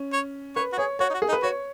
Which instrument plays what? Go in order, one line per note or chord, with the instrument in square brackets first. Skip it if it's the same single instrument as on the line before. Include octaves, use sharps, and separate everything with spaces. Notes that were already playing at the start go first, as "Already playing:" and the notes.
Already playing: [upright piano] C#4
[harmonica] C#5
[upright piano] B4 [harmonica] C#5
[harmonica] F#4
[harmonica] G#4 [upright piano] C#5
[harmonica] F#4 [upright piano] C#5
[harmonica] D#4
F#4
[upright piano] G#4
[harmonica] D#4
[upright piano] B4
[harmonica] F#4 [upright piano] C#5